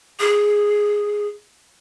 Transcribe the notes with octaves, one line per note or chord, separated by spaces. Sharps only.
G#4